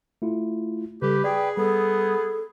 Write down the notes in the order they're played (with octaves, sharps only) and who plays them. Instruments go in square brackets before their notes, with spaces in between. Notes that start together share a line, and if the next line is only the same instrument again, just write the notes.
[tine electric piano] A3 E4 F4
[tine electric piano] C#3 G3 [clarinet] G4 [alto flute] A4 [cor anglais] B4
[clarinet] G#4 [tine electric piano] D5 [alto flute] G5
[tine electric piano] G3 [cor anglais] B3 [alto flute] A4